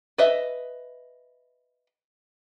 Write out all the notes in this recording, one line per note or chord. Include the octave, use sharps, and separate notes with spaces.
B4 D#5 E5